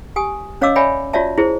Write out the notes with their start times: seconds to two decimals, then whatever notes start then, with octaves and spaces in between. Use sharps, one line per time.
0.16 G4 G#5 D#6
0.61 C#4 C#5 D#5 F5 D6 E6
0.76 C#5 D5 E5 G5 G#5 B5
1.13 F4 F#4 C#5 D5 E5 A5
1.38 E4 G#4 C5